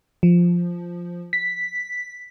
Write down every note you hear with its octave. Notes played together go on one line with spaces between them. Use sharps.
F3
B6